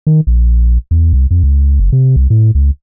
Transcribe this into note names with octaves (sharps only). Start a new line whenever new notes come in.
D#3
A#1
E2
C2
F2
C#2
F#1
C3
C2
A2
C#2